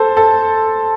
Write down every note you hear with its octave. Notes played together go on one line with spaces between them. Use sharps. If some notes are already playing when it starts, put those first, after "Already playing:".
Already playing: A4 C5
A4